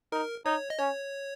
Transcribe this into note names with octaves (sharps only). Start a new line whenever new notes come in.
D#4 A#4
D#4 C#5
D#5
C#4 C#5